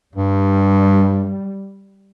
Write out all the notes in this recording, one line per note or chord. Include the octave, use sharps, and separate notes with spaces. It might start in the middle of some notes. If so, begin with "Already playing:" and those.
G2 G3